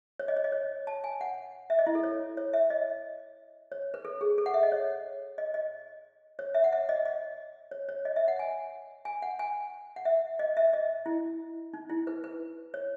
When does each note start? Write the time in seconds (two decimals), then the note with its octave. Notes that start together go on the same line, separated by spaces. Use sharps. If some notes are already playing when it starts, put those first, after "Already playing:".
0.19 C#5
0.28 D#5
0.37 C#5
0.44 D#5
0.52 C#5
0.87 A5
1.04 G#5
1.21 F#5
1.70 E5
1.79 D#5
1.87 E4
1.95 A4
2.03 C#5
2.37 C#5
2.53 E5
2.70 D#5
3.72 C#5
3.94 B4
4.05 A4
4.21 G#4
4.38 A4
4.46 F#5
4.54 E5
4.63 D#5
4.72 C#5
5.38 D#5
5.54 D#5
6.39 C#5
6.54 E5
6.64 F#5
6.72 E5
6.89 D#5
7.05 D#5
7.71 C#5
7.89 C#5
8.05 D#5
8.16 E5
8.28 F#5
8.39 G#5
9.05 G#5
9.22 F#5
9.39 G#5
9.96 F#5
10.05 E5
10.39 D#5
10.57 E5
10.73 D#5
11.06 E4
11.74 D#4
11.90 E4
12.07 B4
12.24 B4
12.74 C#5